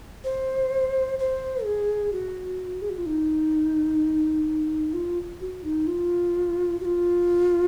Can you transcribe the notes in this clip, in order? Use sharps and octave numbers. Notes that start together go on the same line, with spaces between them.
C5
C5
G#4
F#4
G#4
F#4
F4
D#4
F4
F#4
D#4
F4
F#4
F4